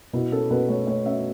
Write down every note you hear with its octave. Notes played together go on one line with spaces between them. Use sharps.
B2 E4
C#4 A4
B2 B4
A3 C#5
A3 C#5
C#4 E5